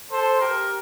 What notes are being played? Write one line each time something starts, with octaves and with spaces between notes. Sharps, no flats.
A4 C5
G4 A#4